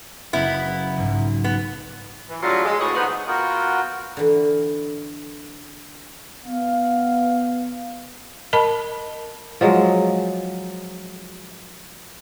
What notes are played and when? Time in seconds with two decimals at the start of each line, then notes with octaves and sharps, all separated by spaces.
0.33 F#1 B3 E4 G#4
0.97 B1 G#2
1.44 B3
2.28 E3
2.42 A2 D3 F#3 G3 F4
2.65 G#3
2.80 D2 A2 F#4 B4 C#5 D#5
2.95 D3 D#3 F3 B3
3.28 B3 F4 F#4 A#4 F#5 G5
4.17 D3 E3
6.46 B3 F5
8.53 A#4 D#5 A5 B5
9.61 F3 F#3 G#3